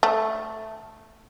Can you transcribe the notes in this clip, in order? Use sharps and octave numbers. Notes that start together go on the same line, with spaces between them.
A3